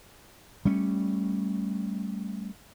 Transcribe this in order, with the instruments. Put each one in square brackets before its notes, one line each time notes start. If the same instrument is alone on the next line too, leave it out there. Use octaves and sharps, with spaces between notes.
[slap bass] G3 A3 C#4